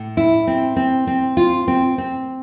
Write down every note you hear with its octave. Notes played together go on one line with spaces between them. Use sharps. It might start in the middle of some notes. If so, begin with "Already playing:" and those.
Already playing: A2
E4
C4
C4
C4
F4
C4
C4